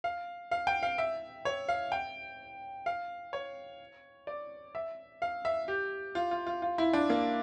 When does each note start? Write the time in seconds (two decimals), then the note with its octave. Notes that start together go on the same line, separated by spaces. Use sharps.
0.04 F5
0.51 F5
0.67 G5
0.83 F5
0.98 E5
1.45 C#5
1.68 F5
1.92 G5
2.86 F5
3.33 C#5
4.27 D5
4.75 E5
5.22 F5
5.45 E5
5.68 G4
6.15 F4
6.31 F4
6.47 F4
6.62 F4
6.78 E4
6.93 D4
7.10 A#3